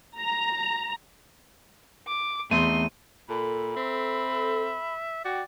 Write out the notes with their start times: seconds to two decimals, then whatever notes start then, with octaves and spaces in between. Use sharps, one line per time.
0.19 A#5
2.07 D6
2.51 E2 A3 C4 D#4 C6 D#7
3.29 A#2 A4 B5
3.76 C4 E5
5.25 F#4 D5 G5